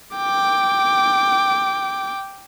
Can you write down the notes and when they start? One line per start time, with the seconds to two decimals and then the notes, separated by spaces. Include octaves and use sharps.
0.16 G5 D6